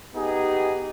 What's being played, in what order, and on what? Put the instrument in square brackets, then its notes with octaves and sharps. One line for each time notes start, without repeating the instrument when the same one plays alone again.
[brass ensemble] B3 D#4 G4 G#4